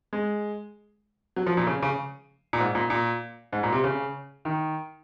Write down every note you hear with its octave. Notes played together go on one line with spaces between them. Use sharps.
G#3
F#3
F3
A#2
C#3
C#3
A#2
G#2
A#2
A#2
G#2
A#2
C3
C#3
D#3